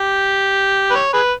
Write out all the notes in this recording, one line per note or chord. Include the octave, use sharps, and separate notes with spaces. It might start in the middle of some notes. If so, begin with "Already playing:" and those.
Already playing: G4
B4
C#5
G#4 B4